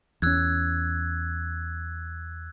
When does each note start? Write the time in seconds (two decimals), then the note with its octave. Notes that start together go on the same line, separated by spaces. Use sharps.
0.22 E2 C#4 E6 F#6 G#6